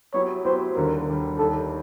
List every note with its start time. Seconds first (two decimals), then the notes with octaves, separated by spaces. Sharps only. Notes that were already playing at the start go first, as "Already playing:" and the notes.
0.13 F#3 B3 E4 G4 C#5
0.45 F#3 B3 E4 G4 C5
0.76 D#2 D3 G3 A#4
1.07 D#2 D3 G3
1.39 D#2 D#3 G3 A4